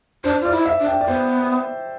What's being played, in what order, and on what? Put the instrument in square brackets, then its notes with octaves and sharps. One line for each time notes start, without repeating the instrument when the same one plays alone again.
[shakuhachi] D4 [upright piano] C5
[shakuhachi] F4 [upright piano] D5
[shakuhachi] E4
[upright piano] E5
[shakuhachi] D4
[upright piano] G5
D5
[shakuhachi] B3 [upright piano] C5